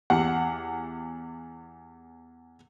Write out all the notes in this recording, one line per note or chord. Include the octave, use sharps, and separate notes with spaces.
E2 G4 F#5